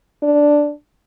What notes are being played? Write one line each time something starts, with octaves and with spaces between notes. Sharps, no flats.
D4